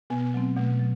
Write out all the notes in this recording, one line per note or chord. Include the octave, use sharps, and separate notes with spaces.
B2 B3
F#3 A3 C4
B2 A3
F#3